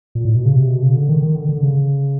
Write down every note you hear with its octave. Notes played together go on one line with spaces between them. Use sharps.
A#2
A2
B2
C#3
C3
B2
C#3
D3
D#3
D#3
D3
D3
C#3